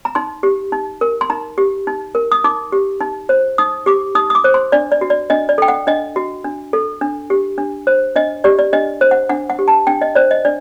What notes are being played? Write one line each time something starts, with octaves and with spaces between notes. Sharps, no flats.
A#5
D#4 C6
G4
D#4
A#4
C6
D#4 A#5
G4
D#4
A#4
D#6
D#4 D6
G4
D#4
C5
D#4 D#6
G4 D6
D#4 D#6
D#6
D6
C5
C6
D4 D5
D5
F#4
D5
D4 D#5
D5
A4 G5
F#5
D4 D#5
F#4
D4
A4
D4
G4
D4
C5
D4 D#5
G4 D5
D5
D4 D#5
C5
F#5
D4 F#5
F#5
G4
A5
D4 G5
D#5
C5 D5
D#5
D4 D5